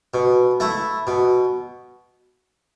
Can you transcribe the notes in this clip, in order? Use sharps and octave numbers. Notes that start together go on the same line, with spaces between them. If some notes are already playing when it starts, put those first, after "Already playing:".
B2
A3 E4
B2